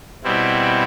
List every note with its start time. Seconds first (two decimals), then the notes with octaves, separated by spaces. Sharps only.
0.24 B2 G3 C4 E4